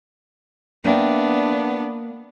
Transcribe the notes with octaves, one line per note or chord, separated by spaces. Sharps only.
A#3 B3 D4 E5 G5